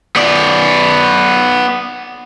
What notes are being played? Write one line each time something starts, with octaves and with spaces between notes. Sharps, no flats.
B3 D5